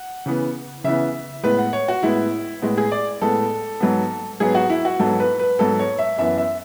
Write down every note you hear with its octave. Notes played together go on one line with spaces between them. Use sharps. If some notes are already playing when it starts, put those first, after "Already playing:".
Already playing: F#5
C#3 E3 B3
C#3 E3 B3 E5
A2 G#3 B3 B4
F#5
C#5
F#4
A2 G#3 B3 E4
A2 G#3 B3
G#4
D5
A2 G#3 B3 A4
G#2 F#3 B3
G#2 F#3 B3 G#4
F#4
E4
F#4
G#2 F#3 B3 A4
B4
B4
G#2 F#3 B3 A4
C#5
E5
F#2 E3 B3 E5
E5